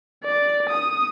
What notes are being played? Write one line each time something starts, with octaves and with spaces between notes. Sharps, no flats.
D5
D#6